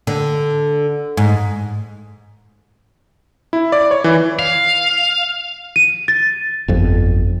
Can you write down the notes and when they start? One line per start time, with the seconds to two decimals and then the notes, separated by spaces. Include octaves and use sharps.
0.07 D3
1.17 G#2
3.53 E4
3.72 D5
3.91 C#5
4.04 E3
4.39 F5
5.76 D#7
6.08 A6
6.68 G1 F2